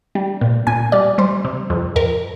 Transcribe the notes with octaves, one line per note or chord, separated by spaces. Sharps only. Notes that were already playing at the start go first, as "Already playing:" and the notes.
G3
A#2
A#2 G#5
G3 D5
G3 C5
C3
F2
F2 A#4